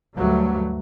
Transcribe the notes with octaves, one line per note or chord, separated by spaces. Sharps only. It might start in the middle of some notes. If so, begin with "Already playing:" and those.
D2 G2 F#3 A3